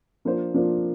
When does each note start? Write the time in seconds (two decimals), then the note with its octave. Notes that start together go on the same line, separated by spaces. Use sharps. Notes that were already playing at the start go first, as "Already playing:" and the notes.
0.25 F3 A#3 D4 F4 C5
0.54 F3 A#3 D4 F4 C5